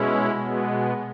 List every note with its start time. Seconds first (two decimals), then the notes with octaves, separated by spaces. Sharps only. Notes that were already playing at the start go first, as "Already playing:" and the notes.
Already playing: B2 G#3 C#4 E4
0.31 B2 G#3 B3